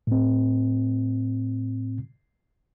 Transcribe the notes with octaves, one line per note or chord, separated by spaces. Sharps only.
A2 C4